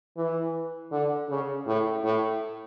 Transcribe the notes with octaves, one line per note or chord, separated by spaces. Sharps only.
E3
D3
C#3
A2
A2